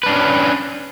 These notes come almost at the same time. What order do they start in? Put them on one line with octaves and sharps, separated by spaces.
B4 D4 C#4